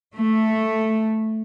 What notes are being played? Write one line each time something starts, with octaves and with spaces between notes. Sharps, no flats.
A3